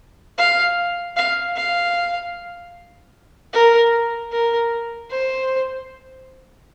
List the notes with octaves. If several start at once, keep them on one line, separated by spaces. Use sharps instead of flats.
F5
F5
F5
A#4
A#4
C5